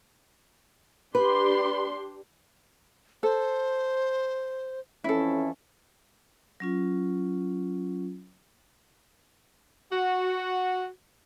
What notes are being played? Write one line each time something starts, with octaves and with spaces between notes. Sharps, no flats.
D4 G4 B4 C6
A4 C5
F2 E3 C#4 E4 A4
F#3 C#4 F4
F#4